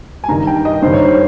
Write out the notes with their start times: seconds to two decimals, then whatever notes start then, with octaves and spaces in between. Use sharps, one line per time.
0.24 G#5
0.29 G2 D#3 A#5
0.47 G5
0.65 D#5
0.82 G2 D#3 C5
0.93 C#5
1.05 C5